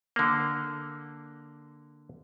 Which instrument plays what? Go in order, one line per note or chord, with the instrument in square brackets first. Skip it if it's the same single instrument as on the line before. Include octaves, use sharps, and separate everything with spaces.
[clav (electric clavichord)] D3 A#3